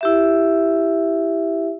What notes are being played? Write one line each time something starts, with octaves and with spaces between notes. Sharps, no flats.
E4 G4 E5